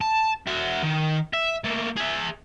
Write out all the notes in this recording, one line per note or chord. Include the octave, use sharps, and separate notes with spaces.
A5
F#4 E5
D#3
E5
A3 A#3
G#4 E5